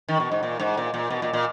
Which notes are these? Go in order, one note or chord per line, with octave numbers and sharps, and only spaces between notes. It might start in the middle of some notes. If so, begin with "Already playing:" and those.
D#3
B2
G#2
A#2
G#2
A#2
A#2
B2
A#2
A#2